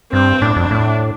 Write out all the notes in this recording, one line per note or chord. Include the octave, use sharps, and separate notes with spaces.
G2 C4
A2 D4
F2
A2